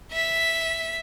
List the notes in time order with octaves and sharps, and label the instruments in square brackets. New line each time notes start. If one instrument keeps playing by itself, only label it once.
[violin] E5 B6